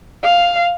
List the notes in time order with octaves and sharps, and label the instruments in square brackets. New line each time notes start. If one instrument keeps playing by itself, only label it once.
[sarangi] F5